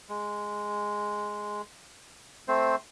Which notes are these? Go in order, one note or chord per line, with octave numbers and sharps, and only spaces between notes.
G#3
A3 C4 C5